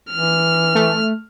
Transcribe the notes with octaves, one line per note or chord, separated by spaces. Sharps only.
E3 F6
A3